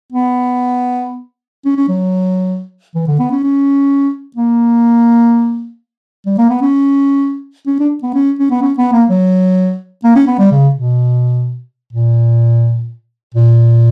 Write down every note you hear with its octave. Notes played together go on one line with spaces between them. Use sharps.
B3
C#4
C#4
F#3
E3
D3
B3
C#4
C#4
A#3
G3
A#3
B3
C#4
C#4
D4
B3
C#4
C#4
B3
C#4
B3
A#3
F#3
A#3
C#4
B3
G3
C#3
B2
A#2
A#2